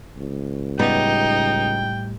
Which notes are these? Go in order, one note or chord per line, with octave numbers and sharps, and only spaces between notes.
C#2
A2 G3 B3 D#4 G5